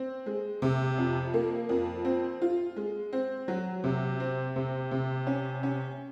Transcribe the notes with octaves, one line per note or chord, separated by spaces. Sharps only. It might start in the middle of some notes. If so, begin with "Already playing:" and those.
Already playing: C4
G#3
C3
F2
A#3
F2
C4
F4
G#3
C4
F#3
C3
C4
C3
C3
C#4
C#4